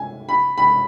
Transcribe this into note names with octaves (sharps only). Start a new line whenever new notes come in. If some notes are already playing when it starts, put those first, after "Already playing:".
Already playing: G#5
B5
B5